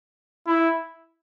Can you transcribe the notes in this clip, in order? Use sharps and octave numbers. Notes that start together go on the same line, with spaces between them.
E4